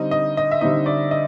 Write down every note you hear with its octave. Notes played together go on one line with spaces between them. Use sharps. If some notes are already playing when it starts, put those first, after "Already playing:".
Already playing: D3 G3 C4 D#4 D#5
D#5
D#5
E5
D3 G3 C4 D#4 D#5
D5
D#5